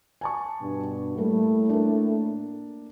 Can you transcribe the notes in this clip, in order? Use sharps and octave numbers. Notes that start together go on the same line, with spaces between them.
G#5 A5 C#6
G2 B2 D4
A2 G3 A3 A#3
A#3 D4